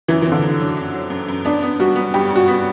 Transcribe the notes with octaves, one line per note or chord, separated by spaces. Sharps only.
F#2 E3
E3
C4
D3
F#2
F#3
F#2
F#3
F#2
F#2
B3 D4
B3
G3 F#4
B3
G2 G4
G2
F#4
B3